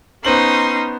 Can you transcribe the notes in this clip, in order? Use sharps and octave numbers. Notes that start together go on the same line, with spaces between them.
B3 C#4 D#4 C5 C6 F#7